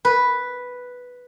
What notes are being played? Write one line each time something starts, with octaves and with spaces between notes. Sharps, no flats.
B4